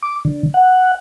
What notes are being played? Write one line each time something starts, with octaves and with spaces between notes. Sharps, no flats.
D6
D3
F#5